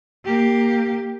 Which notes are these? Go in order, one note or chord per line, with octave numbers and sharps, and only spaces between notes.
A#3 G4